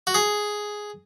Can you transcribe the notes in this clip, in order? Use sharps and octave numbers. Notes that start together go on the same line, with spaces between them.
F#4
G#4